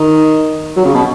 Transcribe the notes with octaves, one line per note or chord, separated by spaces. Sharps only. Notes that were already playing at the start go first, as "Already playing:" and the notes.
Already playing: D#3
F#3
C#3
B2